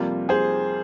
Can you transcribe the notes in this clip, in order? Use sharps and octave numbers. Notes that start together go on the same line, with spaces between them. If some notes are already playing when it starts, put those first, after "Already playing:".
Already playing: F2 C3 G3 A#3 F4
G#4 C5